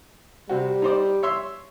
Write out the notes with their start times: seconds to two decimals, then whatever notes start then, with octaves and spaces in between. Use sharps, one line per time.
0.49 C3 G3 F#4
0.82 D#4 C5 D5
1.23 C#5 E5 C6